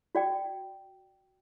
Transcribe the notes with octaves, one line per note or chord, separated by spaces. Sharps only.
F#4 D5 G5